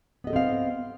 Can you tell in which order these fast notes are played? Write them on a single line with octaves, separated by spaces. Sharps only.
B3 D#5 A4 C4 F5